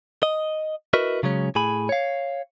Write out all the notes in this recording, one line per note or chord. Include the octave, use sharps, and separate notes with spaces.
D#5
E4 F#4 A#4 B4 D#5
C#3 F#3 G#3 C#4
A2 G#4 G#5 B5
C#5 F5